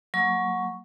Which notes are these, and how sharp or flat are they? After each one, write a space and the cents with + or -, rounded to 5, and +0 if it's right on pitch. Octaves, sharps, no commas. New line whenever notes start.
F#3 -15 A#3 -25 C#6 +0